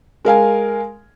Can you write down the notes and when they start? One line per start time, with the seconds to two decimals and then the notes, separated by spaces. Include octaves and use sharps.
0.25 G#3 A#4 F5 G#5